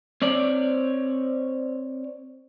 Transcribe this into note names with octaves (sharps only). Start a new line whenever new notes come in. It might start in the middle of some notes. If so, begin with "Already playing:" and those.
C4 C#5 D5